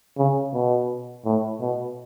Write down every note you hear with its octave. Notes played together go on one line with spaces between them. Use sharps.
C#3
B2
A2
B2